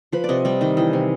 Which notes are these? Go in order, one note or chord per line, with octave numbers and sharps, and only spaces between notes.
F3 B4
D5
C3 D#5
G3 D#5
D#3 D#5
E3 D#5
C3